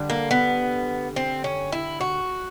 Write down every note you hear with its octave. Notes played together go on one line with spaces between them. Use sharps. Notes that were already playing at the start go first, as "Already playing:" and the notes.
Already playing: D3 G3
A#3
B3
C4
C#4
E4
F#4